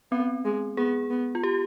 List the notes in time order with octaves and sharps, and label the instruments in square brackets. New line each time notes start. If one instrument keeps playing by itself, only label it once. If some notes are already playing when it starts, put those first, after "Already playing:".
[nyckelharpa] B3 [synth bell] C4
[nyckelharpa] G#3
[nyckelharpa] B3 [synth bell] G#4
[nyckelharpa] B3
[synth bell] F4
G4